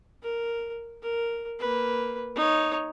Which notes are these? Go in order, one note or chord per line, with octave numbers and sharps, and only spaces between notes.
A#4
A#4
A#3 B4
D#4 C#5